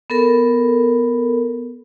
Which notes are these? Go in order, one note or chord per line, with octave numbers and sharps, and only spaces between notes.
B3 A4 A#4